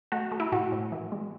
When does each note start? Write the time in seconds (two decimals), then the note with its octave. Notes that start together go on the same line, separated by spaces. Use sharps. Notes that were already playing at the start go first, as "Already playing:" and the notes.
0.12 A3 F#4
0.32 A3
0.40 E4
0.52 A2 F#4
0.72 A2
0.92 E3
1.12 G#3